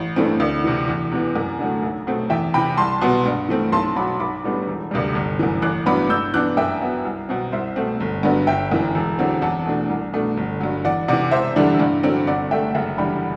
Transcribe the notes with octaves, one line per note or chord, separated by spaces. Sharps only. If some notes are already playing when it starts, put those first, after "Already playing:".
Already playing: A1
G2 E3 A3 C4
D2
C3 E3
E2
C3 E3 B3
F#2
D3 F#3 A3
B1
B2 A3 C4
E2 E5 G5
C3 E3 G5 B5
C2 A5 C6
B2 F#3 B3
G2
E3 A3 C4
B1 A5 C6
B2 F#3 B5 D6
B1 B5 D6
A2 G3 B3 D4
E1
D2 C3 G3
G1
F#2 E3
A1 D6 F#6
G2 F#3 B3 B5 D6
G2 E6 G6
E3 B3 D4 D6 F#6
F#2 E5 G5
F#3 B3
C2
B2 F#3 C4
C2 C5 E5
B2 A3 C4
G1
G2 D3 F#3 B3
G1 E5 G5
F#2 E3
E1
E2 D3 F#3 C4
E2 F#5 A5
B2 A3 D4
C2
B2 A3 D4
G1
G2 F#3
E2 D5 F#5
C3 E3 D5 F#5
E1 C5 E5
E2 D3 G3 D4
G2
D3 F#3 C4
G1 D5 F#5
G2 D3 A3 E5 G5
F#1 E5 G5
E2 D3 G3 G5 B5